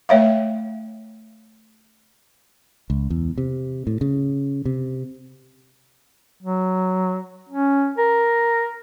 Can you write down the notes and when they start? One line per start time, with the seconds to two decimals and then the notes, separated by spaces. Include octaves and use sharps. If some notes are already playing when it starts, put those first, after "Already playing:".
0.09 A3 C#5 E5 F5
2.90 C#2
3.10 E2
3.38 C3
3.87 A2
4.01 C#3
4.65 C3
6.43 F#3
7.49 C#4
7.98 A#4